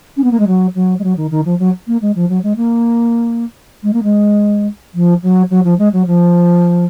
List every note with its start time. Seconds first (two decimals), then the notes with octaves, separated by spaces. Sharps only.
0.17 C#4
0.24 B3
0.31 A#3
0.39 G#3
0.47 F#3
0.75 F#3
0.99 G#3
1.04 F#3
1.17 D#3
1.31 D#3
1.45 F3
1.59 F#3
1.87 A#3
2.02 G#3
2.15 F3
2.29 F#3
2.43 G#3
2.56 A#3
3.83 G#3
3.93 A#3
4.03 G#3
4.94 F3
5.23 F#3
5.50 F#3
5.64 F3
5.79 G#3
5.93 F#3
6.07 F3